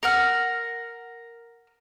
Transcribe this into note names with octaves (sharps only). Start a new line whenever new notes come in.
A#4 F#5 F6